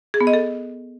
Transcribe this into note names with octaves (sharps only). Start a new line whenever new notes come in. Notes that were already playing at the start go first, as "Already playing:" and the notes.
G#4
B3
D#5
A4